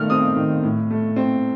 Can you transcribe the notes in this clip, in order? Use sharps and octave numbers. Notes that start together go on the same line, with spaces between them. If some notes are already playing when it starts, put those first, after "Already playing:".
Already playing: D#3 A3 F6
C4 D#6
D#3
A2
A3
C4